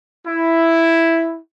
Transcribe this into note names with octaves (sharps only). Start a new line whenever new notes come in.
E4